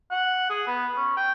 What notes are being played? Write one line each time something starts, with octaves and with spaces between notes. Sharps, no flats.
F#5
G#4
B3
C#4
G5